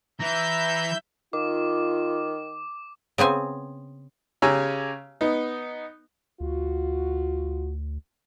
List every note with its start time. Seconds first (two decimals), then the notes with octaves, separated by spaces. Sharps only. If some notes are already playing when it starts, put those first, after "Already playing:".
0.20 E3 E5 A#5 G6
1.33 D#3 F4 D6
3.18 C#3 B3 C4 G#5
4.42 C#3 G4 C#5 G#5 A#5 E6
5.21 B3 D#4
6.40 D2 F4 F#4